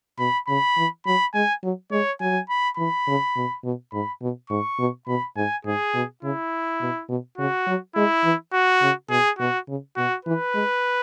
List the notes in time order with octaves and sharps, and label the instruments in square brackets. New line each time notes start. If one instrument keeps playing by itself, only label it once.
[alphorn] B2 [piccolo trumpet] B5
[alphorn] C#3 [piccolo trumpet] B5
[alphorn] E3
[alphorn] F#3 [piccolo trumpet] B5
[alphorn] G#3 [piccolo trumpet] G#5
[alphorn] F#3
[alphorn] G#3 [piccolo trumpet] C#5
[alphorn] F#3 [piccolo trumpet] G#5
[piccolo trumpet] B5
[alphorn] E3 [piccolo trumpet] B5
[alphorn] C#3
B2
B2
[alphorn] G#2 [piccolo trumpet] B5
[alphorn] B2
[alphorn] G#2 [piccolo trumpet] C#6
[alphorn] B2
[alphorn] B2 [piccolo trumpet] B5
[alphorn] G#2 [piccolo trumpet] G#5
[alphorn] G#2 [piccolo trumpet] G#4
[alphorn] B2
[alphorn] C#3 [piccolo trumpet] E4
[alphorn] B2
B2
[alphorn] C#3 [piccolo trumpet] F#4
[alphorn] F#3
[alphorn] G#3 [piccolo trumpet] E4
[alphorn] E3
[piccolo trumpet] F#4
[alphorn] C#3
[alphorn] B2 [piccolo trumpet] G#4
[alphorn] B2 [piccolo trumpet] F#4
[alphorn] C#3
[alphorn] B2 [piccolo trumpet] F#4
[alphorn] E3 [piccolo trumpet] B4
[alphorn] G#3